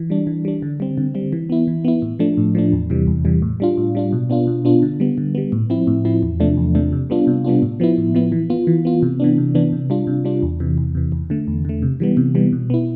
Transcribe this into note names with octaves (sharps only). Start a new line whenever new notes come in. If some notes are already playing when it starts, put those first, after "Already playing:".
Already playing: E3
G3 D4
E3
G3 D4
D3
G3 C4
D3
G3 C4
E3
B3 E4
E3
B3 E4
A2
F3 A3 D4
A2
F3 A3 D4
E2
C3 E3 G3
E2
C3 E3 G3
A2
G3 D4 F4
A2
G3 D4 F4
B2
B3 D4 F4
B2
B3 D4 F4
D3
G3 B3
D3
G3 B3
A2
F3 C4 E4
A2
F3 C4 E4
E2
C3 F3 A3 D4
E2
C3 F3 A3 D4
C3
G3 B3 D4 F4
C3
G3 B3 D4 F4
A2
F3 B3 E4
A2
F3 B3 E4
E3
B3 F4
E3
B3 F4
C3
E3 B3 D4
C3
E3 B3 D4
C3
G3 D4 F4
C3
G3 D4 F4
E2
C3 E3
E2
C3 E3
E2
D3 A3
E2
D3 A3
C3
E3 G3 B3
C3
E3 G3 B3
B2
B3 E4